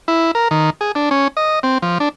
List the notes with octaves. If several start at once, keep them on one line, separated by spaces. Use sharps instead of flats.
E4
A#4
D#3
G#4
D4
C#4
D#5
C4
F3
D4